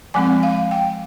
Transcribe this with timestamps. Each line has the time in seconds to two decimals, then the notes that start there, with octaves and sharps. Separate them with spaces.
0.14 F3 G#3 C4 G#5
0.43 F5
0.71 G5